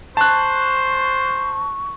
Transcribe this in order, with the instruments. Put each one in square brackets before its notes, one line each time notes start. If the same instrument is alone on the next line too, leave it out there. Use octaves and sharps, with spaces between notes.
[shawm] C5 [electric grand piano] A5 F#6 [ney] C#6